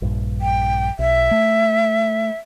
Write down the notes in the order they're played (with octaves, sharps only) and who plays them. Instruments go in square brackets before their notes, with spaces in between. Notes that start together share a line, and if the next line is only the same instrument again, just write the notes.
[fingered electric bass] A#1 G2
[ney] G5
[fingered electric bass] B1 [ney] E5
[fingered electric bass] A3